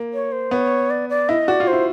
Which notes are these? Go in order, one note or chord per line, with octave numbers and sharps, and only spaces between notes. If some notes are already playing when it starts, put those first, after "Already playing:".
Already playing: A#3
C#5
C5
B3 C#5
D5
D5
E4 D#5
F#4 D5
F4
C5
E4